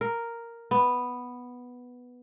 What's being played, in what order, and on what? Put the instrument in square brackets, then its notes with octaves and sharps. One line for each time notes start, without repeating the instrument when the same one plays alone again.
[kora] A#4
B3